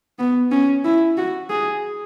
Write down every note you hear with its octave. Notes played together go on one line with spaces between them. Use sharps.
B3
C#4
E4
F#4
G#4